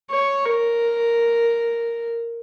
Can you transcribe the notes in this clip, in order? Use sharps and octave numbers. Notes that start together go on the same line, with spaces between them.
C#5
A#4